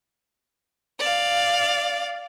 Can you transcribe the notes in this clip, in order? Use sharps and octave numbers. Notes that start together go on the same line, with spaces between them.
D5 F5